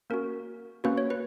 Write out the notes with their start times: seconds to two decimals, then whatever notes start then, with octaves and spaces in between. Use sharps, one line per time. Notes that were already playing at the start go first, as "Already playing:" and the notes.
0.10 A#3 C#4 F#4 A#4
0.84 A#3 C#4 F#4 B4
0.98 C#5
1.10 B4